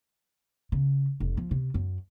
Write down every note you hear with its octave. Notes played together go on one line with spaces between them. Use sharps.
C#3
F1
F3
C3
F#2